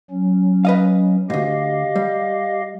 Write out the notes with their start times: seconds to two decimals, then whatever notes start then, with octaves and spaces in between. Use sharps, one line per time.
0.11 F#3 C#4
0.65 B4 D#5 F5
1.30 D2 G#2 G4 D#5 F5
1.96 G3